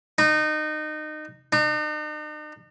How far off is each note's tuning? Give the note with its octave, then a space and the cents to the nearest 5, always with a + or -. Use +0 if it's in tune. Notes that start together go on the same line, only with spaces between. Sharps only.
D#4 -25
D#4 -45